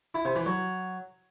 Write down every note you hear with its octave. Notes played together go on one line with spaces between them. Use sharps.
E4
C3
E3
F#3